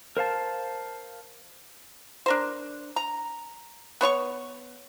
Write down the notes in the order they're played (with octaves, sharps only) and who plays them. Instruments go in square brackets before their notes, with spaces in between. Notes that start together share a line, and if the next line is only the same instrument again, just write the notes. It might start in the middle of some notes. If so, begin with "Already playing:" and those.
[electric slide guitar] A#4 C5 F5 A5
[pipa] D4 A#4 C5
A#5
B3 C5 C#5 C#6